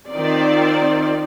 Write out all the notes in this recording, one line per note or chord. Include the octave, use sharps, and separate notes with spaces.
D#3 C4 F4 D5